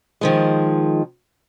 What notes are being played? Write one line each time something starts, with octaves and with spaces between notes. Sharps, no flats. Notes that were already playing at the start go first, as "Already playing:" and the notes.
D#3 F3 G#3